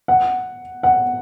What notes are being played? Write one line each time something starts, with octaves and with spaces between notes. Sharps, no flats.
F#5
F#5